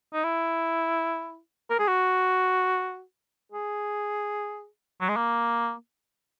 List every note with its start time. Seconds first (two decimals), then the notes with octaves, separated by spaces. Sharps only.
0.14 D#4
0.24 E4
1.70 A#4
1.79 G#4
1.88 F#4
3.52 G#4
5.01 F#3
5.09 G#3
5.16 A#3